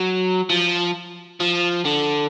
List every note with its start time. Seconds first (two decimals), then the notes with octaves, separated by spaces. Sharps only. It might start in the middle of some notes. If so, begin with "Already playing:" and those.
Already playing: F#3
0.50 F3
1.41 F3
1.85 D3